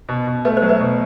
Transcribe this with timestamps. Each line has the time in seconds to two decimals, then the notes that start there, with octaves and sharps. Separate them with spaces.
0.09 B2
0.27 B2
0.45 A3 B4
0.57 C5
0.62 F#3
0.69 B4
0.80 B2